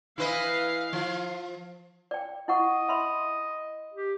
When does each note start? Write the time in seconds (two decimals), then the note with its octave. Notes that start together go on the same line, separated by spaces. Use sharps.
0.18 E3 E4 B4 D#5 F5
0.93 F3 F4
2.11 D5 G5
2.48 E4 D#5 F#5 C#6
2.88 E5 B5 C6
3.94 G4